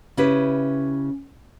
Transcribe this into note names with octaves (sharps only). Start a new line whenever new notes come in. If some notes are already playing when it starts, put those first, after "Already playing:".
C#3 C#4 E4 G4 B4